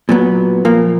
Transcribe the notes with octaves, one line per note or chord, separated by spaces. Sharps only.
A#2 F#3 B3
A#2 F3 A#3